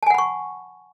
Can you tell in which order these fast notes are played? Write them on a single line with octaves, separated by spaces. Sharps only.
A5 G#5 F#5 B5 C#6